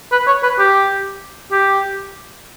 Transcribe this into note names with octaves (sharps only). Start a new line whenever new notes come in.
B4
C#5
B4
G4
G4